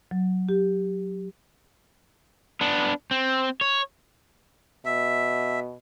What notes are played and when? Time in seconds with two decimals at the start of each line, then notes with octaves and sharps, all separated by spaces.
0.11 F#3
0.49 G4
2.61 B3 D4
3.11 C4
3.61 C#5
4.85 B2 E5